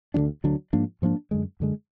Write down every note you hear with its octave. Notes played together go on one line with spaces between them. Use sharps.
D2 D3 F#3 D4
D2 D3 F#3 D4
G#2 F3 A#3 D4
G#2 F3 A#3 D4
F#2 D3 G#3
F#2 D3 G#3